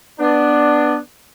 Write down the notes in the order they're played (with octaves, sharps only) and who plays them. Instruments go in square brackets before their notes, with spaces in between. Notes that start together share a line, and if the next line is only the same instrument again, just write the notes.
[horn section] B3 D4